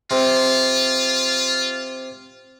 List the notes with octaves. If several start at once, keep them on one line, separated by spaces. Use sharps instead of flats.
C3 F4